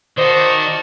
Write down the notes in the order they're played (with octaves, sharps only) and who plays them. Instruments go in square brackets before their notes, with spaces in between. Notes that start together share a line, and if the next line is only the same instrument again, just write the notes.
[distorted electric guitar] D#3 [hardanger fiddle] F#4 A5 [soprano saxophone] C5 [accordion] D5 D#5